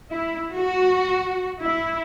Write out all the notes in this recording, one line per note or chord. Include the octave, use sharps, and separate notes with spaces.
E4
F#4
E4